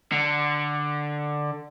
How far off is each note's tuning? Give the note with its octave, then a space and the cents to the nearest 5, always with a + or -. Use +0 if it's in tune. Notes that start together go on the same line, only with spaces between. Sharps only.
D3 +10